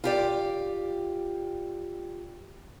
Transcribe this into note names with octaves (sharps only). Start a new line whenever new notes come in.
F4 G4 D5